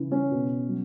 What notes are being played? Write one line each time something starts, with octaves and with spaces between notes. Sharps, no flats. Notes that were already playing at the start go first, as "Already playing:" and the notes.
Already playing: C#3 E3
C#4
B2
F#3